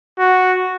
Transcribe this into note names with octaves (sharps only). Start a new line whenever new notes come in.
F#4